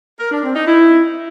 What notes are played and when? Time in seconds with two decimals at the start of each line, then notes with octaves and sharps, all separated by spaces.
0.20 A#4
0.32 D4
0.44 C4
0.56 D#4
0.68 E4